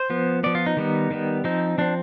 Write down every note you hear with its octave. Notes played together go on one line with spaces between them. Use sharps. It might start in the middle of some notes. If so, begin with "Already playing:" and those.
Already playing: C5
F3 B3
F3 B3 D5
F4
D#4
D#3 G3 B3
D#3 G3 B3
F3 C4 D#4
F3 C4 D4